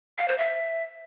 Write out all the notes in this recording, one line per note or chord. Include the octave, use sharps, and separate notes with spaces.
F5
C5
E5